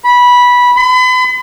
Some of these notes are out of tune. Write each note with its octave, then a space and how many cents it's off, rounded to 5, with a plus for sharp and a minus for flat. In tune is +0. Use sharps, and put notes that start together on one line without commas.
B5 -15
B5 +40